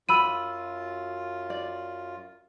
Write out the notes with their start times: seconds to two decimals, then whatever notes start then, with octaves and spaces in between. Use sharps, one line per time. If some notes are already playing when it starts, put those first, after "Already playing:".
0.09 F#2 F4 F#4 B5 E6 D#7
1.50 D5